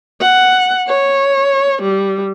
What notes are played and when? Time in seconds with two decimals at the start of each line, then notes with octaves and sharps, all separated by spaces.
0.21 F#5
0.88 C#5
1.82 G3